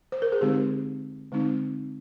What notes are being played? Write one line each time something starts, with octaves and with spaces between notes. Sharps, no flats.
C5
A#4
G#4
D3 G#3 C4 D#4 G4
D3 G#3 C4 D#4